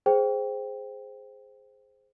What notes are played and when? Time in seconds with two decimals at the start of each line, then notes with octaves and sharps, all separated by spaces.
0.06 G#4 C5 G5